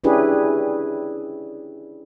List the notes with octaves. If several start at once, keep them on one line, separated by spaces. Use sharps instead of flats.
C#4 D4 E4 G4 G#4 B4